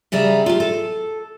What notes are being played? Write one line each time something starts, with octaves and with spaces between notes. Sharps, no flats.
C#3 G3 G#4 D5 E5 A#5
F4 G4
A4